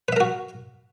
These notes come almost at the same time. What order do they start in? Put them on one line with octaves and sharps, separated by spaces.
B4 E5 A#4 F#4